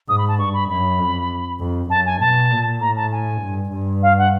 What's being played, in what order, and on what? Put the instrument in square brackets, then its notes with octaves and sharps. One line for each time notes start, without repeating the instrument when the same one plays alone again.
[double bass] G#2 [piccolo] D#6
[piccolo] B5
A5
[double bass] G2 [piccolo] C#6
[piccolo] B5
[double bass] F#2 [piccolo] B5
[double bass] F2
F2
[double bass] F#2 [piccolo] A5
[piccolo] G#5
[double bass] B2 [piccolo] A5
[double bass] A#2
[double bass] A2 [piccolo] A#5
[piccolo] A5
G#5
[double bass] G2
G2
[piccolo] F5
F#5